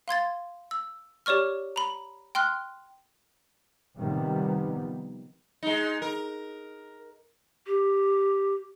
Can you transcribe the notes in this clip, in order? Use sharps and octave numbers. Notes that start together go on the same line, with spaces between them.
F5 C6 G#6 A6
E6
G4 C#5 D5 C#6 F6
A#5 B5
G5 C6 F6 F#6
C3 D#3 F3 G3 B3
G#3 D#4
A#4
G4